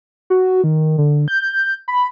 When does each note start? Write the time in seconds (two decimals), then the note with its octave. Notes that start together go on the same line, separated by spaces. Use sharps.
0.30 F#4
0.64 D#3
0.98 D3
1.28 G6
1.88 B5